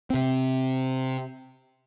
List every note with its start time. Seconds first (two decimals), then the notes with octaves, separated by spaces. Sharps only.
0.10 C3 C4